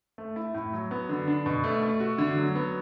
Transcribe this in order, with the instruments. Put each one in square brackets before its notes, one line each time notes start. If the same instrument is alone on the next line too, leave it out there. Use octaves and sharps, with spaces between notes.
[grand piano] A3
E4
A2
F#3
B3
D3
D4
B2
A3
A3
F#4
D3
F#3
B3